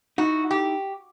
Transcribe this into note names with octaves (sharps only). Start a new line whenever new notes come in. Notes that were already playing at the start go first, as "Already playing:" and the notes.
D#4 E4 F#4
G4